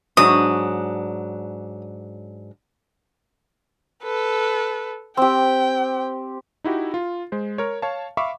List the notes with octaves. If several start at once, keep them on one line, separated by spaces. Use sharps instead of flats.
G#2 F#3 D4 D#6
A4 B4
C4 G4 G5
D#4 E4 F#4 G4
F4
G#3 C5
A#4 C#5
C#5 F5 A5
E5 F5 B5 C#6 D6